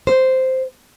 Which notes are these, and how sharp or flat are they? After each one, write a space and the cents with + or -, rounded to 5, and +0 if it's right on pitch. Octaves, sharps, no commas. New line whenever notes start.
C5 -5